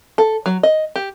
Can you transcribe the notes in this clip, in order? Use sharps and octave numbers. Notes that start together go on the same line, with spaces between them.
A4
F#3
D#5
G4